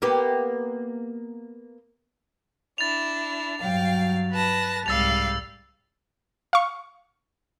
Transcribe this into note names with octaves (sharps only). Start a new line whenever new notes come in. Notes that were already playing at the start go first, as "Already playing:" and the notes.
A#3 B3 G4
D4 E4 A6 F7
G2 F#3 F5 G5
B4 A5 A#6
C2 G#2 G3 F5 E6 A6 F7
F5 C#6